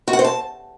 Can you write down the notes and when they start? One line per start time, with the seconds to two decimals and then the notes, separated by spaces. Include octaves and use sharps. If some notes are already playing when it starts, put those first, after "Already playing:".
0.08 F#4
0.13 F#5
0.19 C5
0.25 A5